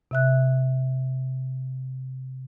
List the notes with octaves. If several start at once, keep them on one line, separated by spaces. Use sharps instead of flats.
C3 E5 F#6